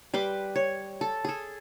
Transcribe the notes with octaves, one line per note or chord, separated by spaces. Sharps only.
G3 B4 C6 D6
C#5
A4
G#4 A4